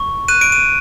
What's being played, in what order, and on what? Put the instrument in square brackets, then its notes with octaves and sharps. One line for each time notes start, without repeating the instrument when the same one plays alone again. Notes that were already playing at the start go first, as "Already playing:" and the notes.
Already playing: [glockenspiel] C#6
F#6 D#7
D7
D#7